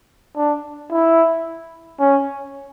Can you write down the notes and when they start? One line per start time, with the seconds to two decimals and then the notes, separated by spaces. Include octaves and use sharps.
0.37 D4
0.91 E4
2.00 C#4